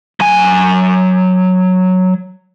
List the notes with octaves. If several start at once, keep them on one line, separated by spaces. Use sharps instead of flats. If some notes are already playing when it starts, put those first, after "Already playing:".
F#3 G#5